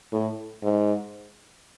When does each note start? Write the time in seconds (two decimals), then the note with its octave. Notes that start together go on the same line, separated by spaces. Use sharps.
0.12 A2
0.63 G#2